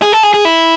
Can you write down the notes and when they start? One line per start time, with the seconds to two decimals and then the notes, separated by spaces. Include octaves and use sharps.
0.02 G#4
0.12 A4
0.23 G#4
0.34 G#4
0.45 E4